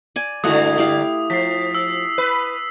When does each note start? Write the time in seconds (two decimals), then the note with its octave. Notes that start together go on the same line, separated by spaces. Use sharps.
0.16 D5 G#5
0.44 G2 D3 A3 E4 F#4 D#6
0.78 E4 G4 F5
1.30 F3 B6 C7
1.75 E6
2.18 B4